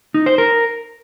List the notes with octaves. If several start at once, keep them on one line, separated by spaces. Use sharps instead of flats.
D#4
C5
A#4